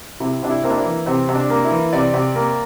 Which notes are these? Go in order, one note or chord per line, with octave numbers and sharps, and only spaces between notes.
C3 E4
C3 D4
E4
A#3 C4
D4
E4
E3
C3 C4
C3
D4
A#3
E4
E3
C3 D5
C3
A#3